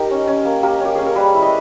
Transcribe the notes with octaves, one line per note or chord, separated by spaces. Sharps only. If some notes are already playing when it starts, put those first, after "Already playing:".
Already playing: D#4 G4 A#4
C#4
C#4
A#3
A#3 G4 A#4
C#4 G4
C#4 G#4
A#4
G3 G#4 B4
E4
B4 D#5